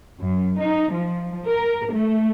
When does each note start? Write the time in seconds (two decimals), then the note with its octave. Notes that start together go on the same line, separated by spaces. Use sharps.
0.19 F#2
0.59 D#4
0.92 F3
1.46 A#4
1.93 A3